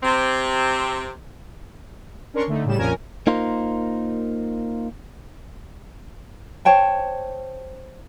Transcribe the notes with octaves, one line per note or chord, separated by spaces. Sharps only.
C3 C4
C#4 D4 A#4 C6 C#6
D3 A3 D#4
A2 C#3 G3 E7
A#1 F2 F3 C#4 A#4 G#5
A#3 D#4 F4 A#4 C5
C5 C#5 G5 A5